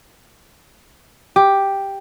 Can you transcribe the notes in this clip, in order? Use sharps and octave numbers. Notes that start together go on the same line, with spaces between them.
G4